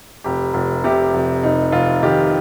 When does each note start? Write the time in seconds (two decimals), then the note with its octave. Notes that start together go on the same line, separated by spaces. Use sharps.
0.24 F1 G4
0.54 F1
0.84 C3 G4
1.14 F1
1.43 F1 D#4
1.72 F1 F4
2.03 D#3 G4